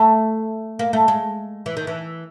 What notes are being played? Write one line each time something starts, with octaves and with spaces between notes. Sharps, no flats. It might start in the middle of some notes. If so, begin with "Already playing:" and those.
Already playing: A3
A#3
A3
G#3
E3
D#3
E3